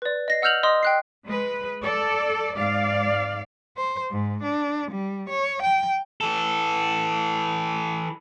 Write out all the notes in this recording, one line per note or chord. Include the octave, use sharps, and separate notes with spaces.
B4 D5
D#5 A#6 C7
F#5 E6 F6 G6 F7 F#7
D#5 C6 D#6
G5 F#6 C7
G#3 B4
A4 D5
G#2 D5 F5
C5
G#2
D4
G3
C#5
G5
E3 A4